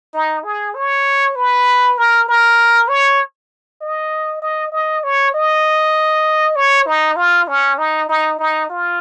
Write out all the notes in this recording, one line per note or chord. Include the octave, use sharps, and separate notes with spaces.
D#4
G#4
C#5
B4
A#4
A#4
C#5
D#5
D#5
D#5
C#5
D#5
C#5
D#4
F4
C#4
D#4
D#4
D#4
F4